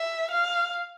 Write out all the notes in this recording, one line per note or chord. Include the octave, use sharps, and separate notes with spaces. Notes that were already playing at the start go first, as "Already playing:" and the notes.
Already playing: E5
F5